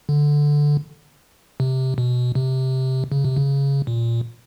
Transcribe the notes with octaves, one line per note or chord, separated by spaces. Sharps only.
D3
C3
B2
C3
C#3
C3
C#3
A#2